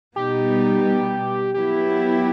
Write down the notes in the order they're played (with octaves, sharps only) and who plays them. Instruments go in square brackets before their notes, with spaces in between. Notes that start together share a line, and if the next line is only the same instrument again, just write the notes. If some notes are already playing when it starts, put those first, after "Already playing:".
[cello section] B2 G3 B3 D#4 [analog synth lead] G4
[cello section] F#3 B3 E4 [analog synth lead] G4